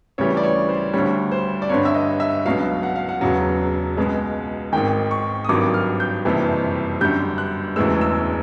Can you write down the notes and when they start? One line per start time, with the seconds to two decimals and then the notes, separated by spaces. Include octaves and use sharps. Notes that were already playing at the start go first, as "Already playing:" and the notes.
0.18 D2 C#3 E3 G3 C#5
0.37 D5
0.43 C#5
0.69 C5
0.93 D2 D3 G3 C#5
1.31 C5
1.62 D5
1.69 G1 G2 D3 C#5
1.85 E5
1.94 D#5
2.20 E5
2.45 C#2 B2 F#3 F5
2.83 F#5
2.96 F5
3.09 F#5
3.21 E1 E2 C#3 F#3
3.97 C#2 B2 G#3
4.72 G#1 G#2 D#3 G5
5.11 C#6
5.44 D#6
5.49 G#1 G2 D#3 F#3 D6
5.74 F6
6.00 G6
6.25 F#1 F2 C3 E3 G3
7.01 G1 F#2 D3 G3 G6
7.38 F#6
7.76 E1 D2 C#3 E3 G#3 E6
8.01 E6